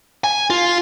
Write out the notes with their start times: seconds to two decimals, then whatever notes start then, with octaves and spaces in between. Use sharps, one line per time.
0.24 G#5
0.50 F4